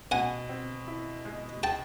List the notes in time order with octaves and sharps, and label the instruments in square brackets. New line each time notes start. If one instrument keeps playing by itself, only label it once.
[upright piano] B2 [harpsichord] F#5 G#5
[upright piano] C4
E4
G#3
[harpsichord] G5 A5